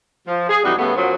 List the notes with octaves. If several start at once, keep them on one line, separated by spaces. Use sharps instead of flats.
F3
G#4
F2 C3 E3 G3 D#4 F#4
C#3 G3 A3 B3
F#2 F3 F#3